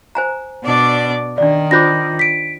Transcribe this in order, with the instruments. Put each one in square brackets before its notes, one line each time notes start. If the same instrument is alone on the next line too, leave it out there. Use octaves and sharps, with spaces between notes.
[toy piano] C5 G#5 A#5
[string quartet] B2 D4 D5
[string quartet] D#3 [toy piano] D4 D5
[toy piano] D4 F4 C5 [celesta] D6 G6 A#6
[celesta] B6 D7